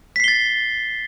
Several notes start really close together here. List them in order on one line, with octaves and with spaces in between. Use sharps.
B6 C7 G7 A6